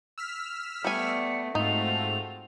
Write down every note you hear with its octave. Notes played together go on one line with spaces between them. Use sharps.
E6 F6 B6
G3 A3 B3 G#5 C#7
G#2 A3 C4 D#4 F4 F#4 F7